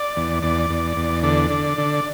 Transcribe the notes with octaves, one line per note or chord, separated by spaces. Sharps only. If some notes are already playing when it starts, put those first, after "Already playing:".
Already playing: D5
E2
E2 D5
E2
E2
D3 D5
D3
D3